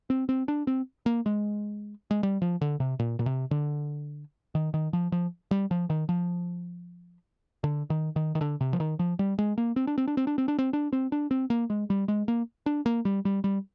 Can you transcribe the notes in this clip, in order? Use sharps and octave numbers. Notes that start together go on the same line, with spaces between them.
C4
C4
D4
C4
A#3
G#3
G#3
G3
F3
D3
C3
A#2
A#2
C3
D3
D#3
D#3
F3
F3
G3
F3
D#3
F3
D3
D#3
D#3
D#3
D3
C3
F3
D#3
F3
G3
G#3
A#3
C4
D4
C4
D4
C4
D4
C4
D4
C4
D4
C4
D4
C4
A#3
G#3
G3
G#3
A#3
D4
A#3
G3
G3
G3